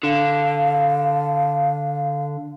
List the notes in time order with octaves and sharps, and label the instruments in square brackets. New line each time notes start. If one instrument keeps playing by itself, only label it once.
[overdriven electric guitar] D3 [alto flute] F5